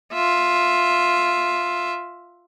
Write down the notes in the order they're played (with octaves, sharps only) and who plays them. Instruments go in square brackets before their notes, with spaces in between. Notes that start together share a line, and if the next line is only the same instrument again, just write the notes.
[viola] F4 E5